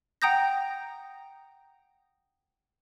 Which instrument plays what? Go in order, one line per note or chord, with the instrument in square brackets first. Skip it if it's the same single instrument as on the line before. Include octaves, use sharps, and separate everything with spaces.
[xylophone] F#5 G5 A#5 D#6 G6 A#6